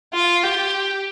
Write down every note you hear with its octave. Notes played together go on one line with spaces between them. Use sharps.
F4
G4